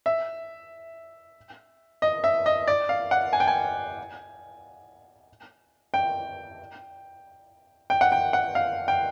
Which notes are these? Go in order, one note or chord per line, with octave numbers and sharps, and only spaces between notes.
E5
D#5
E5
D#5
D5
F5
F#5
G#5
G5
G#5
G5
G5
F#5
G5
F#5
F5
G5